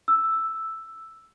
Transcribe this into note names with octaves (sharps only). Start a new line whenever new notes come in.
E6